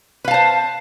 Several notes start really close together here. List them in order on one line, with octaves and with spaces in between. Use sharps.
B4 F5 A5 C5